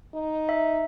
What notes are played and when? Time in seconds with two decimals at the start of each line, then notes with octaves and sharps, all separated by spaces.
0.14 D#4
0.49 E5